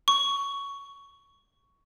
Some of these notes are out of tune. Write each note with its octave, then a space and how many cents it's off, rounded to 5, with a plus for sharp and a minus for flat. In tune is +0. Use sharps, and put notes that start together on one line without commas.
C#6 +10